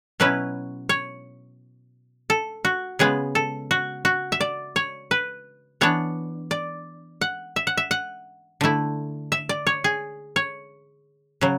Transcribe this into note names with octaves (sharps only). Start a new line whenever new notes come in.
B2 F#3 C#4 E4 B4
C#5
A4
F#4
C#3 G#3 B3 G#4
A4
F#4
F#4
E5
D5
C#5
B4
E3 B3 D4 C#5
D5
F#5
E5
F#5
E5
F#5
D3 A3 E4
E5
D5
C#5
G#4
C#5
C#3 F#3